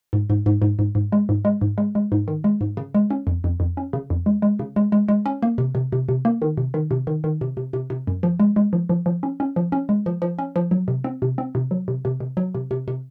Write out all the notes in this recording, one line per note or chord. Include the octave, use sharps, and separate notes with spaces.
G#2
G#2
G#2
G#2
G#2
G#2
G#3
G#2
G#3
G#2
G#3
G#3
G#2
D#3
G#3
G#2
C#3
G#3
C#4
F2
F2
F2
C#4
C#3
F2
G#3
G#3
C#3
G#3
G#3
G#3
C#4
A#3
C3
C3
C3
C3
A#3
D#3
C3
D#3
C3
D#3
D#3
C3
C3
C3
C3
F#2
F3
G#3
G#3
F3
F3
F3
C#4
C#4
F3
C#4
G#3
F3
F3
C#4
F3
F#3
C3
C4
C3
C4
C3
F#3
C3
C3
C3
F#3
C3
C3
C3